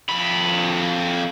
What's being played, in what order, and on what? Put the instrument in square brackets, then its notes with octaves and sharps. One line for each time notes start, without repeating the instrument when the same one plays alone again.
[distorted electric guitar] F2 B5